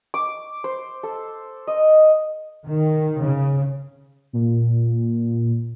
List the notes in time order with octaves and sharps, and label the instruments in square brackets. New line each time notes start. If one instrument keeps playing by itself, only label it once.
[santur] D6
C5
A4
D#5
[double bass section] D#3
C#3
[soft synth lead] A#2